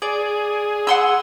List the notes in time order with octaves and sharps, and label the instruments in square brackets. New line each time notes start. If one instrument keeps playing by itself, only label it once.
[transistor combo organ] G#4 [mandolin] D5
[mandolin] F#5 C6 E6